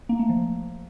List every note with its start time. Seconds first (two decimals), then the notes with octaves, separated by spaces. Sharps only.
0.09 A#3
0.19 A3
0.29 F3